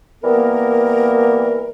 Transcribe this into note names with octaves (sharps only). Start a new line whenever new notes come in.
E3 G3 A#3 B3 A#4